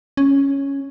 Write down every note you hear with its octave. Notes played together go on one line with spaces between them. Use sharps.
C#4